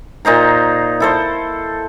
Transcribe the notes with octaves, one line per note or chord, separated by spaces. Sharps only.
A#2 D#4 C5 A#5
E4 A4 C5